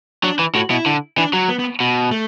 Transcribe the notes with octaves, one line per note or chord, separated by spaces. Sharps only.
F#3 D4
E3
A2 F#4
B2 E4
D3
E3 D4
F#3
B3
B3
B2
A3